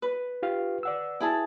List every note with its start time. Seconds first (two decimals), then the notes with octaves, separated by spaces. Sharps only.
0.02 B4
0.43 F4 G4 F5
0.83 D5 F#5 E6
1.20 E4 G#4 A5